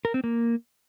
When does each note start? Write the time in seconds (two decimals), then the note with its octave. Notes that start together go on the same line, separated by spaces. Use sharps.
0.05 A#4
0.14 C4
0.24 A#3